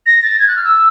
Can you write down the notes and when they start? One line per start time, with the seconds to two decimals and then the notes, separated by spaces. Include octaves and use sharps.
0.06 A#6
0.23 A6
0.39 G#6
0.48 F#6
0.56 F6
0.64 E6